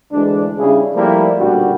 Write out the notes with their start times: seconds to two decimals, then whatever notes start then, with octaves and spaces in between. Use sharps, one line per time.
0.12 D2 E3 G#3 D4
0.58 C#3 G3 D4 E4 G#4
0.94 F3 G3 A3 A#3 C4 E4
1.39 B1 A#2 D3 G3 F#4